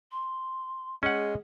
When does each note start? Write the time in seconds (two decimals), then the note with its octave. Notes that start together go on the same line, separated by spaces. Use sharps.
0.11 C6
1.03 G#3 C#4 G#4 F#5